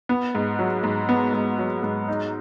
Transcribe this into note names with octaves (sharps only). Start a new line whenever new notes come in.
B3
G#2
F#3
G#2
B3
G#2
F#3
G#2
D#4